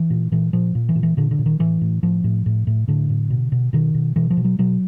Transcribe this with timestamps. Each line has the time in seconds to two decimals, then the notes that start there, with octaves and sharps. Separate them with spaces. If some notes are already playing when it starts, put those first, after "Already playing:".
Already playing: E3
0.10 A#2
0.32 A#2 E3
0.53 A#2 F3
0.75 A#2
0.89 E3
0.95 A#2
1.03 E3
1.17 A#2 D3
1.31 D3
1.39 A#2
1.46 D#3
1.59 A2 E3
1.81 A2
2.03 A2 F3
2.24 A2
2.46 A2
2.67 A2
2.88 A2 D3
3.10 A2
3.30 B2
3.52 B2
3.73 B2 D#3
3.94 B2
4.16 B2 E3
4.30 F3
4.37 B2
4.45 F#3
4.59 B2 F#3